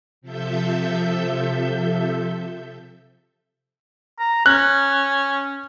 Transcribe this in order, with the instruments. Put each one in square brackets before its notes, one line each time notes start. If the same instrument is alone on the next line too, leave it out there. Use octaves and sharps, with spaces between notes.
[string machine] C3 F3 A4 E5 G6
[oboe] A#5
[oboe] C#4 [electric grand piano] F#6